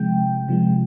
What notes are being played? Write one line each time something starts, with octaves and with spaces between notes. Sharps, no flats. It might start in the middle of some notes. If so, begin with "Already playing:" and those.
Already playing: C3 F3 G#3 G5
C3 F3 G#3